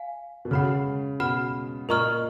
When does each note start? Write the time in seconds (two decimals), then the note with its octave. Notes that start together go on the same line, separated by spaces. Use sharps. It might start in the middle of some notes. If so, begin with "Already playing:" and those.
Already playing: F5 G#5
0.45 B2
0.51 C#3 F#5 B5 F6
1.20 B2 F#5 B5 F6
1.89 A#2 A#4 D#5 A#5 C#6 F6